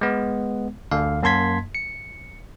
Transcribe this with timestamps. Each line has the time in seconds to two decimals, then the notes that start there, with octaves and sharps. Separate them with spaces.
0.01 G#3 B3
0.91 D2 D3 F5
1.23 F#2 A#3 A5 C6 G#6 B6
1.75 C#7